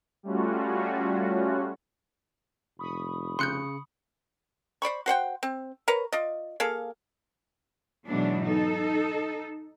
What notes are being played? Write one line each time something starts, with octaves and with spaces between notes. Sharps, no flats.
G3 A3 C#4 F4 F#4
F1 B5 C#6 D#6
C#3 C6 F#6 G6 C#7
C5 D5 B5 C#6
F#4 C5 F#5 G5
C4
A#4 B4 C#5 A#5
F4 D5 D#5
A#3 G#4 A4 F5
G#2 B2 E3 F#3 G#3 D4
D#4 A4